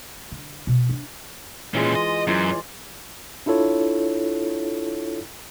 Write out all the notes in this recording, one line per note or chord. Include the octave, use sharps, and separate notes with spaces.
D3
B2
D4
A#2 E3 G#3 C#4 F4
D#5
F#2 E3 F4 D5
D4 E4 F4 A4 C#5